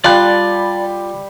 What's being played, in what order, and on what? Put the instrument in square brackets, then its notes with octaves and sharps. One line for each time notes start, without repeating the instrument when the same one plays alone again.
[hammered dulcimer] G3 [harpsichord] F4 [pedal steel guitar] D5 A5 F#6